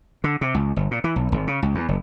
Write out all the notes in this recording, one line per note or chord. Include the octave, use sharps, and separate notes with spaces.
D3
C3
C#2
G1
A#2
E3
B1
G#1
C#3
C#2
E2
F#1